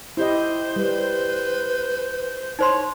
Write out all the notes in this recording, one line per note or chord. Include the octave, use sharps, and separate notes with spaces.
E4 G4 C5 D#5
G3 B4
D#4 C5 C#5 C6